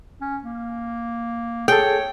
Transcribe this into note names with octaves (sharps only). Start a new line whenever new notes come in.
C#4
A#3
G#4 A4 C#5 G5